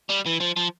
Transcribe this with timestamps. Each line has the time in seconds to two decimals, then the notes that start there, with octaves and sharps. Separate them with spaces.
0.09 G3
0.26 E3
0.40 F3
0.56 F3